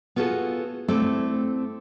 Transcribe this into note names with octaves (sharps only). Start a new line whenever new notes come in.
B3 F4 F#4 G#4 A4
A3 C4 E4 A4 D5